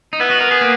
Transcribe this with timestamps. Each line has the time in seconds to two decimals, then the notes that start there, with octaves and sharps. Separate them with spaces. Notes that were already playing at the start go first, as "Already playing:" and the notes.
0.13 D#4
0.20 B3 E4
0.31 F#4
0.40 A#4
0.51 G#4
0.61 A#3